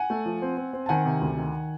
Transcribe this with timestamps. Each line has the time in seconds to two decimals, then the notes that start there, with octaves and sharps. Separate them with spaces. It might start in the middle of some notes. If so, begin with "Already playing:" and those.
Already playing: F#5 G#5
0.10 A3
0.26 F3
0.42 C4
0.57 C4
0.73 C4
0.86 A5
0.89 D#3 F#5 G#5
1.05 C3
1.21 D2
1.37 D#3